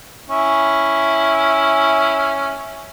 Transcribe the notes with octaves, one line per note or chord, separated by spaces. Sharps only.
C#4 E4